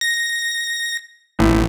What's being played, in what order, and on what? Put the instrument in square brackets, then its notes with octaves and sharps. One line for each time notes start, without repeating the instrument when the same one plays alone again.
[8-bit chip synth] A#6
[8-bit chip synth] A1 [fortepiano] A2